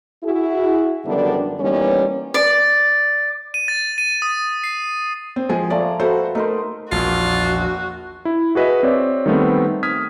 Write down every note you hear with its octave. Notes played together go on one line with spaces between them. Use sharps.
E4 F#4 G#4
F#2 D3 D#3 G3 B3 D4
E3 G3 A#3 B3 C#4 D#4
D5
D#7
A6
D#7
D#6
C7
C4
F3 G#3 G#4
F3 A3 D5 A#5
F#4 A4 B4 C5 E5 F#5
A3 D#4 A#4 C5
A#1 E2 F4 F#4
E4
F#4 G#4 B4 D#5 E5
C4 C#5 D5
D#3 G3 A3 B3 C4
D#6 F6 G#6 B6